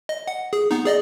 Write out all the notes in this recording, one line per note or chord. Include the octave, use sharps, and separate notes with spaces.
D#5
F#5
G#4
B3 D#4
G#4 D5 D#5